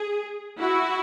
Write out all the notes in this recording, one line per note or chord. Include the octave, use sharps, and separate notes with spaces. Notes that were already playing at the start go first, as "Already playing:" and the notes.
Already playing: G#4
E4 F#4